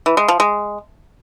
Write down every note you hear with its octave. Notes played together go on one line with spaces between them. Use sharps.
E3
G#3
F3
G#3